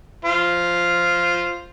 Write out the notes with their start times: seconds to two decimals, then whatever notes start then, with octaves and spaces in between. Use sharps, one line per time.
0.25 F4 C5